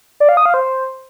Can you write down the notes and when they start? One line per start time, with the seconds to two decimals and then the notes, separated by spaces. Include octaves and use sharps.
0.20 D5
0.29 F5
0.37 D#6
0.45 F5
0.54 C5